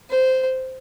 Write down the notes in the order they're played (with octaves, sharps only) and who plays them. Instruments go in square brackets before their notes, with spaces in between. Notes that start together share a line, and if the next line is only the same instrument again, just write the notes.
[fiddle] C5